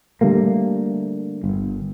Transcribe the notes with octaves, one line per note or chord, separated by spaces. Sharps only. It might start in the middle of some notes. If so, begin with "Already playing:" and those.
D3 G3 A3 A#3
G1